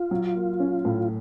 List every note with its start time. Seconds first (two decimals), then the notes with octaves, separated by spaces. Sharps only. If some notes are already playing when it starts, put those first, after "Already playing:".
Already playing: F4
0.11 F#3
0.35 A#3
0.60 C#4
0.85 A2